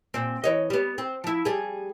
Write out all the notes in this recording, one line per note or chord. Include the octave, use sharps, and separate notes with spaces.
A#2 C4
E3 C#5 D#5
G3 B3
C4
F3 E4
G3 G#4